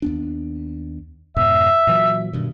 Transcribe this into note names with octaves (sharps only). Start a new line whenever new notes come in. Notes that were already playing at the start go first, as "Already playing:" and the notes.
D#2 B3 D4
F2 G#2 B2 E5
A#2 E3 F#3
G2 B2 D#3